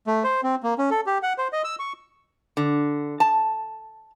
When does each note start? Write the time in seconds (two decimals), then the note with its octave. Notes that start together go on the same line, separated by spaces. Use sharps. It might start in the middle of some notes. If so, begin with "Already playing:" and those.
0.07 A3
0.24 C5
0.43 C4
0.63 A#3
0.79 C#4
0.91 A4
1.07 G4
1.23 F#5
1.38 C5
1.53 D#5
1.64 E6
1.79 C#6
2.57 D3
3.20 A5